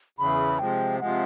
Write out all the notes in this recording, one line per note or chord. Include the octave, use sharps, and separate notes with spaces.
E2 C#3 E3 B5
C3 F3 G#3 G5
C3 F3 G#3 F#5